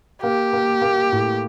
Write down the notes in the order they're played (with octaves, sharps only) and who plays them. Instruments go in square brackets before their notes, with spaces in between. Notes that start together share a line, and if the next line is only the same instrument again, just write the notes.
[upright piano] A#3 [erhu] G4
[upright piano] A#3
A#3
A2